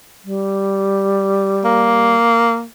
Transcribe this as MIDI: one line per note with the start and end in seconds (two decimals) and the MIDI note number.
0.24 2.16 55
1.65 2.64 58